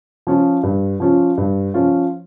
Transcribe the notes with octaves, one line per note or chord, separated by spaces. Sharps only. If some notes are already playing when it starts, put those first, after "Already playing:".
F3 C#4 F4
G2
F3 C#4 F4
G2
F3 C#4 F4